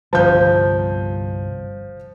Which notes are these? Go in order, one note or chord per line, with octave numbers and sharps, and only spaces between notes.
G1 C2 F3 G6